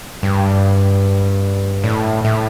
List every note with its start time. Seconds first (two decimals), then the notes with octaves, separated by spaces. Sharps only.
0.23 G2
1.84 A2
2.25 A2